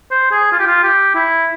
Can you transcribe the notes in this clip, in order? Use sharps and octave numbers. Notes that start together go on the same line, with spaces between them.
C5
G#4
F4
G4
F4
G4
E4